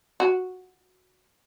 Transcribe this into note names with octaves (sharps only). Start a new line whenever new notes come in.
F#4